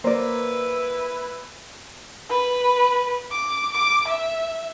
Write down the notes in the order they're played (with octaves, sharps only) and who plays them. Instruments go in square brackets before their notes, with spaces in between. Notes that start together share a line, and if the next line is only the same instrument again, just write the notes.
[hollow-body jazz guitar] A#3 [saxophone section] E4 B4 [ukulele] C5 D5
[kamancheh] B4
D6
D6
E5